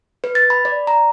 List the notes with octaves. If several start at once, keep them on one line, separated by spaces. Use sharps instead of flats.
B4
A6
B5
D5
A#5